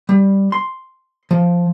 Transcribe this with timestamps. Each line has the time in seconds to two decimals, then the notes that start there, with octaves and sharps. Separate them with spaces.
0.09 G3
0.52 C6
1.31 F3